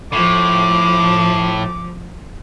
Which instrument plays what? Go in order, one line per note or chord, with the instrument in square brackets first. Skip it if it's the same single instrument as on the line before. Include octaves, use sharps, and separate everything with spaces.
[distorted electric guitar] A2 [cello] F3 [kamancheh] D6